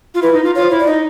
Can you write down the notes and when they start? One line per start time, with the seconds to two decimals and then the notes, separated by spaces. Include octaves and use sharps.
0.15 F4
0.22 E4 B4
0.33 D#4
0.44 F4
0.55 F4 C#5
0.63 C5
0.71 E4 C#5
0.79 D5
0.87 D#4 D#5